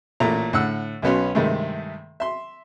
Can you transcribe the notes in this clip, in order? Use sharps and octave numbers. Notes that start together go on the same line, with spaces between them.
A1 A#2 A3 A#5
A2 D3 F#5 E6
B1 B2 B3 C#4 C6
G2 C3 D#3 G#3 A3
E5 C6